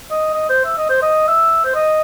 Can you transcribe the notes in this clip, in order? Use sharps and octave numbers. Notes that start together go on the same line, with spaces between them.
D#5
D#5
C5
E5
D#5
C5
D#5
E5
C5
D#5